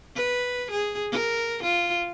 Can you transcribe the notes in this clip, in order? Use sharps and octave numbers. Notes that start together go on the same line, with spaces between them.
B4
G#4
A#4
F4